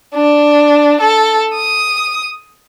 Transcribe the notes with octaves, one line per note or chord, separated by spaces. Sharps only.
D4
A4
D#6